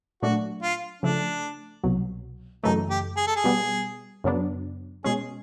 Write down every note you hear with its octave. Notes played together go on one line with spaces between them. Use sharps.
A#2 F#3 A3 D4 F#4
F4
C#3 F3 A3 D4
C2 B2 F#3
F#2 C#3 E3 A3 D#4
G4
G#4
A4
G#4
B2 G3 B3
F#2 C#3 F#3 B3 D4
B2 G#3 C#4 G#4